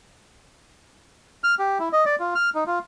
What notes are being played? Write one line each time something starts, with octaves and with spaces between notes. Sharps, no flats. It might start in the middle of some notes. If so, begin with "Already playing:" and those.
F6
G4
E4
D#5
D5
F4
F6
D#4
F4